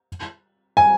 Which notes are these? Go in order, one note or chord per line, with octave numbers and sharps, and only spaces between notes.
G#5